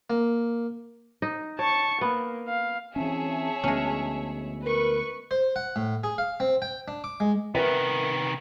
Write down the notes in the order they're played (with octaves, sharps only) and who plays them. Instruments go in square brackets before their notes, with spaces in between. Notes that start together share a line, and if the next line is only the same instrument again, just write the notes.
[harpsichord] A#3
[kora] D#4
[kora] C#5 [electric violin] A5 C#6
[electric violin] A#3 [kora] B3
[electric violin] F5
[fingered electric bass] E3 C4 C#4 [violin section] G#4 C#5 E5 [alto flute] A5
[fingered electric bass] D2 B3 [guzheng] G#3 C#4
[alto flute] A#4 [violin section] B4 C#6
[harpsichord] C5
F#5
A2
G#4
F5
C4
G5
D4
D6
G#3
[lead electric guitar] C3 D#3 [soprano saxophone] B3 [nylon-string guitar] A#4 B4 E5